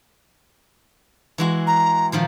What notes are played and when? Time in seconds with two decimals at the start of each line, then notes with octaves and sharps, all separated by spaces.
1.38 E3 G#3 F#4
1.67 A#5
2.12 A#2 D#3 F3